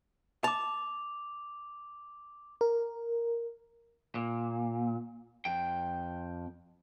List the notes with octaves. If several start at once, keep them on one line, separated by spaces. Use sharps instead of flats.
A5 D6 F7
A#4
A#2
F2 G5